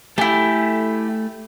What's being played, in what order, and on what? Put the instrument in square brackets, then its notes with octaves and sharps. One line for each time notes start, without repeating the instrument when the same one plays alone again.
[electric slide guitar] A3 A4 G#5 [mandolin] E4 G4